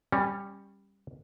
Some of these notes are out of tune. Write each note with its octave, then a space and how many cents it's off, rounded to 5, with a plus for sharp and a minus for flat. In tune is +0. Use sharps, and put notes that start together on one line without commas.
G3 +10 C#4 -15